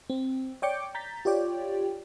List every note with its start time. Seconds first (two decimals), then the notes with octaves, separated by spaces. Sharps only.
0.10 C4
0.62 C#5 D5 G5 D6 G6 C#7
0.95 A#5 G6 A6 B6
1.25 F4 G4 C#5 D5 G5